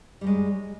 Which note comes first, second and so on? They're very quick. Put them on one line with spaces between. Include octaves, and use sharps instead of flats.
G3 F#2 G#3